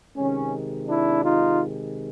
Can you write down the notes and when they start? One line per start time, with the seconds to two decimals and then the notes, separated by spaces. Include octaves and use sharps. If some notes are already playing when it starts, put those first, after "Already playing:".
0.17 C3 D#3 G#3 C#4
0.89 D4 E4
1.25 D#4 F4